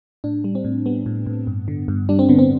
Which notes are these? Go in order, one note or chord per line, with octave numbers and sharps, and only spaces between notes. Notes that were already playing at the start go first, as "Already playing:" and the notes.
A2 D4
G3
C4
A2
G3 B3
A2
A2
G2
D3
G2
G3 D4
C4
D3 B3
C4